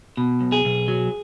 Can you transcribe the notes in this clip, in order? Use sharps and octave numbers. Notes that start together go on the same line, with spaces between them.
B2
B1
G#4
B1
F#3